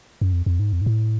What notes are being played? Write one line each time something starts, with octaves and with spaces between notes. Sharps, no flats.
F#2
F2
F2
G#2
F2
G#2
A2